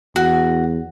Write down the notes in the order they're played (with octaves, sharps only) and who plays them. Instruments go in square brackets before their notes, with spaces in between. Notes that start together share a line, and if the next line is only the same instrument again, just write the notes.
[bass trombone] E2 [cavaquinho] F#4